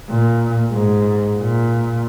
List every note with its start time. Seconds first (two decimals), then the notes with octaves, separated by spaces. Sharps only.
0.10 A#2
0.72 G#2
1.39 A#2